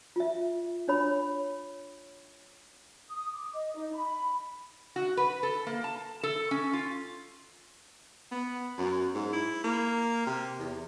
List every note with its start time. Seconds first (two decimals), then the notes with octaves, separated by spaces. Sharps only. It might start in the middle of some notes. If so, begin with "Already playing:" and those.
0.16 F4 E5
0.88 D4 C#5 B5
3.09 D#6
3.33 D6
3.54 D#5
3.75 D#4
3.94 B5
4.96 F#4
5.17 B4
5.43 A4
5.67 A#3
5.84 A5
6.23 A4
6.51 C#4
6.73 F4
8.31 B3
8.78 F#2
9.14 G#2
9.33 E4
9.64 A#3
10.27 C3
10.58 E2